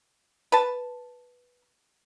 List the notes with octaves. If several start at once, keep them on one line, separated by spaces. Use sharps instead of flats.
B4 A5